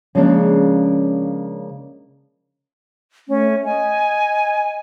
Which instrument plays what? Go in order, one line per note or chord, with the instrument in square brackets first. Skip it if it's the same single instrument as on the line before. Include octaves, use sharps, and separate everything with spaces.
[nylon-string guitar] C#3 F3 G#3 A#3 C#4 D4
[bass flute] A3 [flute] C#4
[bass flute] D#5 [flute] G#5